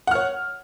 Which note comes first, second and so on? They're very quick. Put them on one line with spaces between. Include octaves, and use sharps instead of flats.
F#5 F6 C#5